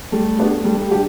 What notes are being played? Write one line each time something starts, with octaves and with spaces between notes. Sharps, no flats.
G3 A3
B3 D4 G4
G3 A3
G3
D4 G4